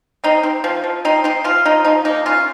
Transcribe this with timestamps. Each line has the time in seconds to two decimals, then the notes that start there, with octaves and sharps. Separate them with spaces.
0.24 C4 D#4
0.43 C4
0.64 F3
0.84 F3
1.05 C4 D#4
1.24 C4 D#4
1.44 F3 F4
1.65 F3 D#4
1.85 F3 D#4
2.05 A#3 D#4
2.26 C#4 F4